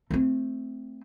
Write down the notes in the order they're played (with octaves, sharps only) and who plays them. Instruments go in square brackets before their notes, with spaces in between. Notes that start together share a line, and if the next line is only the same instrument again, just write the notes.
[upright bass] A3 C4